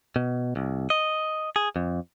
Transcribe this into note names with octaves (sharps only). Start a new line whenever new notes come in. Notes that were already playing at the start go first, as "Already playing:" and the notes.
B2
C2
D#5
G#4
F2